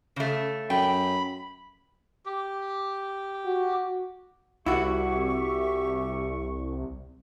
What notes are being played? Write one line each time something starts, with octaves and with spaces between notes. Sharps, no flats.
C#3 A3
F#2 G5 B5
G4
F#4
C2 E4 F#4 G4 E5 C#6